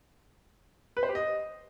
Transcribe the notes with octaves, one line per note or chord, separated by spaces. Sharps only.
B4
C5
G4
D#5